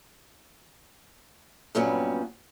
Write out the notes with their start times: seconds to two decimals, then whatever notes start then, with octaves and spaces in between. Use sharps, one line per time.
1.75 G2 A#2 F#3 G3 B3 C#4